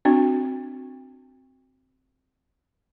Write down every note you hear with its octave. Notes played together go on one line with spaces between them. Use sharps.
C4 D4 F#4